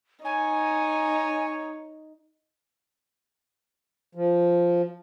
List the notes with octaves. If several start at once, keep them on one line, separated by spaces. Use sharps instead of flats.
D#4 C#5 G#5
F3